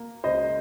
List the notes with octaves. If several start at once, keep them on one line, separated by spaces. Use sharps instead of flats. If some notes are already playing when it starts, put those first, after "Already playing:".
Already playing: A#3
C#2 C5 D#5